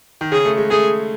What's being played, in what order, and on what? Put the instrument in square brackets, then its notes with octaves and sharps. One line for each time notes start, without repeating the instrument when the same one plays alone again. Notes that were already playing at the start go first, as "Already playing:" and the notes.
[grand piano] D#3
[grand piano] C#3 [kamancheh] G#4
[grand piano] A3
G#3
[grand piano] A3 [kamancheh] G#4